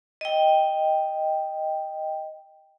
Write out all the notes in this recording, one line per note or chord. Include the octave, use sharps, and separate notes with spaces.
D#5 G5